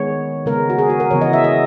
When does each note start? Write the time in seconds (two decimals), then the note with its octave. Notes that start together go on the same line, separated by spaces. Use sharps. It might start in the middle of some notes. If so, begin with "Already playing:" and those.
Already playing: D#3 G#3 B3 C#5
0.46 C#3 G#3 B3 A#4
0.70 F#4
0.78 G#4
0.90 F#4
1.00 A#4
1.11 C#3 E3 B3 C#5
1.21 D#5
1.33 E5
1.44 D#5